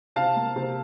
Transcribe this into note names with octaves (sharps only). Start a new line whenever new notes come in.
C3 F5 A5
A#3
C3